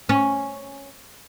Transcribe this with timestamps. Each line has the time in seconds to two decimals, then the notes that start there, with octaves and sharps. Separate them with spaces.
0.09 C#4